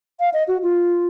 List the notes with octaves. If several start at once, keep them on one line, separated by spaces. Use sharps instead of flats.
F5
D#5
F#4
F4